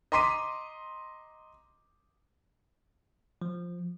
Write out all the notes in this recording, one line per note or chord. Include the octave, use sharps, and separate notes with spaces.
D#5 A#5 C6 D6 B6 D#7
F3